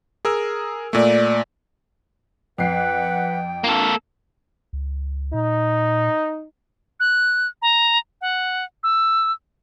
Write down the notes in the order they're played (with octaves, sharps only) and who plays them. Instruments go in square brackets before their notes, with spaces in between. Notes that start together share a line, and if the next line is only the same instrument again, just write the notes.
[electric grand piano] G#4 A#4 E6
[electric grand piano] A#2 A3 [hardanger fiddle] D5
[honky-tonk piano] F2 C7 [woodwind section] B4 F#5 [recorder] G5
[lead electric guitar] A#3 A4 [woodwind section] D4 F4
[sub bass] C#2
[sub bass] A#2 [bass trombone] D#4
[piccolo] F#6
A#5
F#5
E6